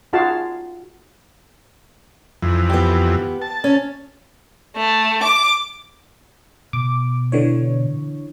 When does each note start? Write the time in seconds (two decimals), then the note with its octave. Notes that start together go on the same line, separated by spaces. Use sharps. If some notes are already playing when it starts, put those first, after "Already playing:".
0.13 D#4 F4 F#4 G#4 F5 A5
2.43 F2 E3
2.70 B3 G4
3.42 A5
3.64 C#4
4.76 A3
5.23 D6
6.73 B2 D6
7.32 D3 E3 C#5